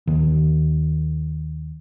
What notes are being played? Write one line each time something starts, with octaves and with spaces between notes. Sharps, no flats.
D#2 D#3